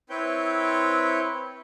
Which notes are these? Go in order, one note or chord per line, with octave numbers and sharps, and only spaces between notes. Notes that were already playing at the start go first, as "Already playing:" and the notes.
C4 E4 B4 C#5 G5 G6